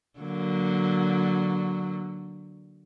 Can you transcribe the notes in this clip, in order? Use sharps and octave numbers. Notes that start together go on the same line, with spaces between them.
D3 F#3 A#3